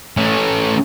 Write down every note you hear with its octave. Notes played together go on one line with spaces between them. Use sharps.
A3 C#4